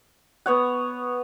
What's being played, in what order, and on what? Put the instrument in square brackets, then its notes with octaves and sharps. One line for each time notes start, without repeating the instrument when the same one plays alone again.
[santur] B3 C#5 F#5